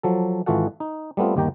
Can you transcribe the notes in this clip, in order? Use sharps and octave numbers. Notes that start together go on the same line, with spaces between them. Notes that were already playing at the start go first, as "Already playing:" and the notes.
F3 F#3 A4
G#1 E3 F4 F#4 A4 F#5
D#4
G3 A3 B3 C4 F4
G1 D#2 D#3 G4 G5 A#5